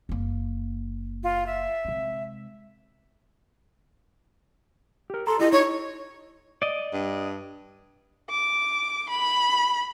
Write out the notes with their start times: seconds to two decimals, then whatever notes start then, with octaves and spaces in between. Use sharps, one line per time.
0.09 F#1 A#3
1.23 F4
1.46 E5
1.85 C3 G#3
5.10 G4 A#4
5.27 A4 A#5 C6
5.39 E4 F4 G4 A4 D#5
5.52 D#4 F4 C#5 D#5 C#6
6.62 D5 D#5
6.93 G2
8.31 D6
9.10 B5